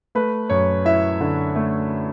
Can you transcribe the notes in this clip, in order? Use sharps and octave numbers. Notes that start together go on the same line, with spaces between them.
A3 B4
F#2 C#5
E4 E5
D3
A3